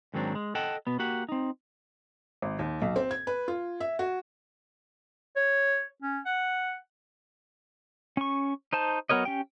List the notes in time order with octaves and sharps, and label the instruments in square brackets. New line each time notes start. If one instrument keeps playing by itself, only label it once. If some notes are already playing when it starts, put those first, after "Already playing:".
[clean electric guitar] G#2 D#3 F#3 C4 D4
G#3
A4 D#5 F#5 G5 A5
B2 B3
A#3 F#4 G4 F#5
C4 D#4
[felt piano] G#1
D#2
B1
C4
G#6
B4
F4
E5
F#4
[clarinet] C#5
C#4
F#5
[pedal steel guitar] C#4 C#6
D#4 C5 A5
F#3 B3 A#4 C#5 D#5
C#4 G4 G5